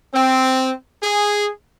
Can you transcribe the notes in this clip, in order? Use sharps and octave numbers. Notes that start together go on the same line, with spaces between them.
C4
G#4